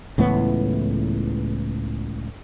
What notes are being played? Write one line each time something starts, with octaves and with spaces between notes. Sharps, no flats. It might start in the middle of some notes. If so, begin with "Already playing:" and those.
C#2 A2 E3 B3